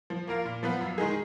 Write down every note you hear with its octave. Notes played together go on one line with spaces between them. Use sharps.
F3
A#3 F4 A#4 F5
A#2
F3 B3 F4 B4
F#2
D#3 G#3 D#4 G#4